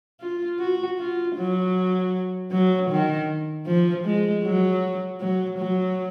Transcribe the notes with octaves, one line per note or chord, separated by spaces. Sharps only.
F4
F#4
F4
F#3
F#3
D#3
F3
G#3
F#3
F#3
F#3